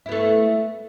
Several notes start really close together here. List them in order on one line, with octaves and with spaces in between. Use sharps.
E4 B3 A3